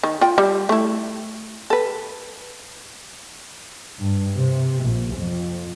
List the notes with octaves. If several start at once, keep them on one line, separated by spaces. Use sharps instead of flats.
D#3
F4 G5
G3
A3 E4
A4 B4
G2
C3
A#1
F2